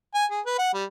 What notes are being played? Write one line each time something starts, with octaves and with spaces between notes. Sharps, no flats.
G#5
G#4
B4
F#5
G3